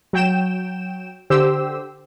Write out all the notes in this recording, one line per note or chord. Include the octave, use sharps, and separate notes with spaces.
F#3 G5 E7
D3 G4 C5 E6